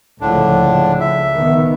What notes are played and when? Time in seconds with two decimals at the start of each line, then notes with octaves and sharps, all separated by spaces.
0.21 C#2 A2 D3 F3 D4
0.64 C#2
1.00 E5
1.36 D#3 B3